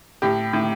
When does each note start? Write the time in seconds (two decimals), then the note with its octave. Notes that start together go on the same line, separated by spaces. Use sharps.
0.22 A2 G4
0.53 A2